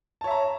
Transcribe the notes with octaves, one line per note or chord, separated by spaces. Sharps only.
C#5 E5 A5 A#5